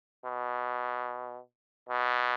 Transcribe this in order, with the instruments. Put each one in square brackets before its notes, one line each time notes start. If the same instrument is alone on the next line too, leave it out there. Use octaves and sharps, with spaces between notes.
[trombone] B2
B2